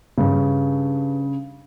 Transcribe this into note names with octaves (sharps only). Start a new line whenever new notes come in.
G2 C#3